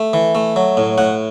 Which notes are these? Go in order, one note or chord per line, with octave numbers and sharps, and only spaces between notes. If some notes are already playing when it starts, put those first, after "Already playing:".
Already playing: A3
E3
A3
F#3
A2
A2 F#5